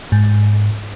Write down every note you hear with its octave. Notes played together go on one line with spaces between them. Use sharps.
G#2